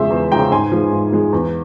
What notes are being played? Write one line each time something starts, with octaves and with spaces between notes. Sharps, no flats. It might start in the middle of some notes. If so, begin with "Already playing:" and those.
Already playing: E2 C#3 F3 G#3 G#4 C5 E5
E2
C#3 F3 G#3 G5 A#5
G#2 G#5 C6
F3 G#3
G#2
F3 G#3
E2